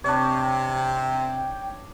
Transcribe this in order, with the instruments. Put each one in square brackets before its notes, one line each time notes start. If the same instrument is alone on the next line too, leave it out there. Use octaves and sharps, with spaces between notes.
[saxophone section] C3 [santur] D4 C#5 [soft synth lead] G5